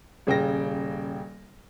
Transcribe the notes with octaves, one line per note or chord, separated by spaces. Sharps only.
D#1 C#3 G5 A#6